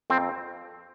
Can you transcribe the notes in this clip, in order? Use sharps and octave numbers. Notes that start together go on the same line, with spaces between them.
F2 C4